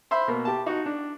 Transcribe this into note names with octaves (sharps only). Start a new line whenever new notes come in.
C5 E5 B5
B2 A#3
G4 A5
D#4 F#4
D4